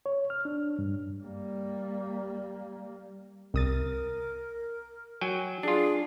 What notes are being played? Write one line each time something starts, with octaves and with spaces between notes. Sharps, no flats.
C#5
F6
D4
G2
G3 A#3
C2 A#4 D#6 A6
F#3 G5 G#5
D4 F4 G#4